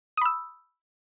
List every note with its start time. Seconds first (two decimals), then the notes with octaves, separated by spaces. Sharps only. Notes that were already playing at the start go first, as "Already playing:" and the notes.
0.17 D#6
0.21 B5
0.25 E6